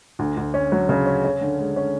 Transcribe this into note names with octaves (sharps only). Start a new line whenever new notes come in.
D2
D2
C#4
F#3
C#3
C#4
C#4
D3
G#3
C#4